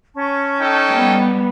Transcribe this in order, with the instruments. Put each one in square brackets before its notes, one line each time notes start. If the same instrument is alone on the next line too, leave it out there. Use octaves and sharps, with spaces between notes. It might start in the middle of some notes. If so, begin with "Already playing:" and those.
[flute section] C#4 A5 C#6
[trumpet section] D#4 A4 G5
[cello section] G3 B3